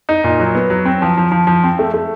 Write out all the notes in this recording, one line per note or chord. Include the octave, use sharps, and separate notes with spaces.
D#4
A#2
F#3
B3
F#3
C4
F3
F3
F3
F3
C4
A3
A3